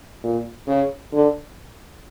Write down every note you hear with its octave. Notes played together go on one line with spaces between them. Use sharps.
A#2
C#3
D3